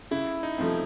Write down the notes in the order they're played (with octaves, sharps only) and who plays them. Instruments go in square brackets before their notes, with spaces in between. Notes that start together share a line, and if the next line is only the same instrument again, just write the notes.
[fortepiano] C#3 [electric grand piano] E4
[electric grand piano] D#4
[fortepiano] F3 A3 C4